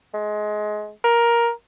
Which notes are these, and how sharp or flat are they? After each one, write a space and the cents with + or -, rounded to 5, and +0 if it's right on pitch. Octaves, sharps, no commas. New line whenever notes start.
G#3 +25
A#4 +10